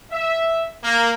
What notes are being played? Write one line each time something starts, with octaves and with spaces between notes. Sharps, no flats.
E5
A#3